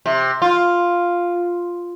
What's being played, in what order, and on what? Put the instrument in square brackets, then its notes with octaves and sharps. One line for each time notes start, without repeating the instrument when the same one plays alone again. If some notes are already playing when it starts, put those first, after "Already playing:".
[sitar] C3
F4